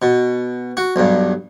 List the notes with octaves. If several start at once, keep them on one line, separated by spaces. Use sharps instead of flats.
B2
F#4
B1 G2